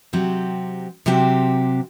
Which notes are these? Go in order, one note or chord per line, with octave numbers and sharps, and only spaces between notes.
C3 F#3 C4 G4
C3 F#3 C4 G4